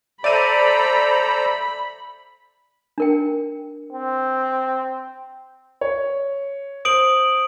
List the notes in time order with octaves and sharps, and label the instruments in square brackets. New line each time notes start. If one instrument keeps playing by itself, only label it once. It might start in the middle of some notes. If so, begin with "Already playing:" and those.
[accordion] A4 C5 A#5 [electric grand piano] D5 E5 D#7 [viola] B5
[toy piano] D4 A#4 G5
[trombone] C4
[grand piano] C#5
[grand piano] C5 [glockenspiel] D#6 D7 F#7